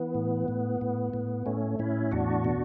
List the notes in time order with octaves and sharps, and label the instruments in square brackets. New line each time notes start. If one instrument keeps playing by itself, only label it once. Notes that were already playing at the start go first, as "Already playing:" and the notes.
Already playing: [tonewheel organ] E3 B3
A2
A2
A2
A2
A2 A3 C#4
A2 C#4 E4
E2 D4 F#4
B2